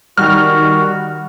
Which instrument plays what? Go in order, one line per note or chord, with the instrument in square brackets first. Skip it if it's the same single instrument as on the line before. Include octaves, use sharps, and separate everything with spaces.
[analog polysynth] D#3 G3 [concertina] F#4 [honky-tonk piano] F6